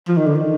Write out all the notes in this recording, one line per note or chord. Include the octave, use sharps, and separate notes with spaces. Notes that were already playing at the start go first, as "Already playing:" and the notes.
F3
D#3
D3
D#3